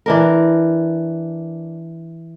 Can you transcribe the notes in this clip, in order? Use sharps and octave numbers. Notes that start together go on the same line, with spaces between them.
E3 D4 A#4